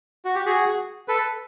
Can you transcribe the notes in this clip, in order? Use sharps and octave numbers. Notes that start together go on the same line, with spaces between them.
F#4
G4
F#4 G#4
A4 B4